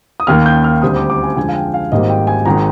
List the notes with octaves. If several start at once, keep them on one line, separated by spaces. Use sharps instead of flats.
D#6
D#2 D#3 A#3 F6
G6
F6
D2 D3 G3 C4 D#6
D6
D6
G#5
F2 D3 G#3 G#5
F5
G5
F5
G#1 G#2 D#3 G3 A#3 D#5
G5
G#5
G#1 D#3 G#3 A#5